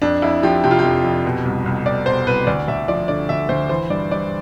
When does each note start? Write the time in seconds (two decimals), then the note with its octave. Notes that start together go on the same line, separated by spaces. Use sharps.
0.02 F2 D4
0.22 F2 E4
0.43 F3 G4
0.64 C3 G4
0.71 F4
0.79 G4
0.84 F2
1.04 F2
1.25 B2
1.45 C2
1.66 C2
1.85 B2 D5
2.06 B2 C5
2.27 C2 B4
2.47 D2 D5
2.68 D2 E5
2.88 F3 D5
3.08 D3 D5
3.29 D2 E5
3.49 D2 C5
3.69 E3 C5
3.90 G2 D5
4.11 G2 D5